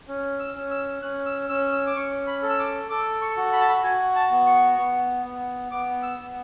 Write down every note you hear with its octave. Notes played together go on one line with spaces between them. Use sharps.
C#4
E6
C#4
E6
C#4 F#6
E6
C#4 E6
E6
D6
C#4 C#6
B5
A4
E6
D6
A4 D6
C#6
F#4
B5
A5
B5
F#4 G#5
A5
B3
C#6
B3
B3
B3 D6
E6
B3